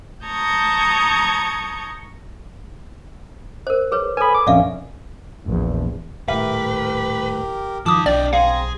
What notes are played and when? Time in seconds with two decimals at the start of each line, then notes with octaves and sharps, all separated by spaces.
0.25 A5 A#5 C#6 D#6 G6 G#6
3.67 A#4 C5
3.92 G#4 B4 C#5
4.17 A4 B4 G#5 B5
4.35 D6
4.47 A#1 F2 C#4 D5 E5 F5
5.46 A#1 E2
6.28 D#1 A2 G4 A#4 B4 E5
7.86 G2 D#3 F3 A5 D6 D#6
8.06 B1 D4 D5 D#5 G5 F6
8.33 C4 G#4 F5 A#5